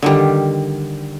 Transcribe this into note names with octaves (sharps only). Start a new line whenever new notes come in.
D3 D#3 G3